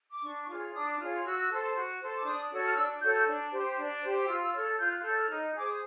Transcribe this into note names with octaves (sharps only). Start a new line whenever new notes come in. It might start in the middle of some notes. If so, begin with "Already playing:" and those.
D6
D4 C#6
C#6
F4 G#4 C#5 D6
D4 D#6
F4 G#4 C#5
F#4 E6
A4 C5
F#4
A4 C5
D6
D4 D#6
F#4 A4 C#5
F6
D4 E6
F#4 A4 C#5 G6
G6
D4
G4 C5
D4
G4 C5
F4 E6
E6
A4 C#5 F6
F4 G6
F#6
A4 C#5 G6
F6
D#4
G#4 C5 D6
D#6